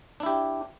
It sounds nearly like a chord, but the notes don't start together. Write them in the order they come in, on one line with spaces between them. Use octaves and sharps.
D4 E4 G4